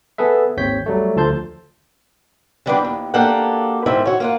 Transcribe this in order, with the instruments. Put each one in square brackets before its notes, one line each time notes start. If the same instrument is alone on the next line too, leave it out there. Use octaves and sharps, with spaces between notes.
[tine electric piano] B3 G#4 A4 B4 E5
G#1 D#2 C4 C#5 G6 B6
F#3 G3 A3
D2 F3 A4 A5 C6 G6
[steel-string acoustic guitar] D3 E3 G3 B3 C4 D4
D#2
A#3 D4 F#4 G4 A4 F#5
G#2 D#3 E4 C5 E5
F#4 C#5
A#3 F4 F#5